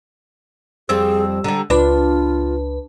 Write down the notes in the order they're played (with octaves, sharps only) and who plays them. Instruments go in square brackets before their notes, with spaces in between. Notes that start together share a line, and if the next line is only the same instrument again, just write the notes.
[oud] F2 G3 C4 [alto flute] G#4 [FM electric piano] E6
[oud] D3 G3 [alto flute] A#5
[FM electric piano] C#2 B4 [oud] D4 [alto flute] F4